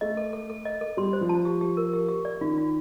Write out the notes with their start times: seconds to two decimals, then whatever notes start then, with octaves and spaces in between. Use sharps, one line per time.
0.01 A3 D#5
0.17 A4
0.33 A4
0.50 A4
0.65 D#5
0.81 A4
0.97 G3 C6
1.13 C5
1.21 F3
1.29 A5
1.45 G4
1.61 G4
1.77 A#4
1.94 G4
2.09 G4
2.25 D5
2.41 D#3 F4
2.57 F4